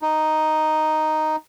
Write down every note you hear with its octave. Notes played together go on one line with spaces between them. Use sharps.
D#4